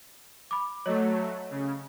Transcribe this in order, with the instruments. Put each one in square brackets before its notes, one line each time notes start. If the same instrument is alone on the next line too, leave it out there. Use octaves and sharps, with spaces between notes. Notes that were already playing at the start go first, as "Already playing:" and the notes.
[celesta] B5 D6
[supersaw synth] F#3 A3 [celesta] C#5 D#5
[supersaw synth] C#3